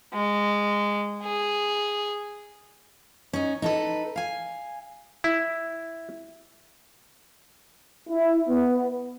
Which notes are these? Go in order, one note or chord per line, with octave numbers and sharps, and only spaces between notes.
G#3
G#4
C#4 D#4
D#4 A4 B4
F5 G#5
E4
E4
B3